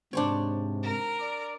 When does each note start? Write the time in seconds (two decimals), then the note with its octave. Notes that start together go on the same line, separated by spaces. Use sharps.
0.13 G#2 C3 D4 C5 C#5
0.83 A#4
1.20 D5